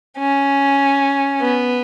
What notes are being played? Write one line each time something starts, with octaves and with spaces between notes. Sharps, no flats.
C#4
B3